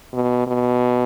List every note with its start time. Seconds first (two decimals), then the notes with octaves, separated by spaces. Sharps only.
0.13 B2
0.47 B2